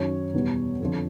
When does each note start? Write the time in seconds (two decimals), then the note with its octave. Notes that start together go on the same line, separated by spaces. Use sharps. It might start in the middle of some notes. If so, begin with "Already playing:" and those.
Already playing: F#2 D#3 F#3 C#5
0.34 E2 B2 G3
0.80 F2 D3 F3